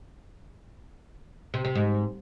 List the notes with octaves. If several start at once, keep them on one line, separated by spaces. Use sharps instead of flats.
C3
C3
G#2